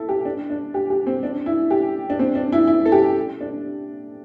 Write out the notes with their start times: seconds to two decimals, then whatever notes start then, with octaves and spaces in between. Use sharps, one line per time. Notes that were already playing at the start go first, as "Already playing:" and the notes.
Already playing: E4 A4
0.09 G4
0.25 D4
0.50 D4
0.74 G4
0.90 G4
1.07 C4
1.23 D4
1.46 E4
1.70 G4
2.10 D4
2.19 C4
2.35 D4
2.52 E4
2.67 E4
2.86 A4
2.92 G4
3.41 D4